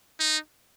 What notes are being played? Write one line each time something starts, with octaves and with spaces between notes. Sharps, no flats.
D#4